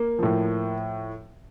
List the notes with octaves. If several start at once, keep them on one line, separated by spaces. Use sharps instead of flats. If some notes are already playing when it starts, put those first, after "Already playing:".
Already playing: A#3
A2 F3